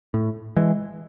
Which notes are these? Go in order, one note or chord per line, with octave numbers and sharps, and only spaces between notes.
A2
E3 G#3